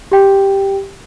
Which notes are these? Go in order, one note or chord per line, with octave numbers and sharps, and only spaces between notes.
G4 G5